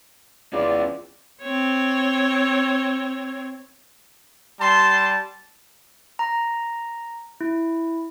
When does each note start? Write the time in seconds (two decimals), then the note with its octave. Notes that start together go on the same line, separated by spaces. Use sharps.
0.53 E2 C#4 F4 D5
1.42 C4 C#5
4.61 G3 A5 C6
6.19 A#5
7.41 E4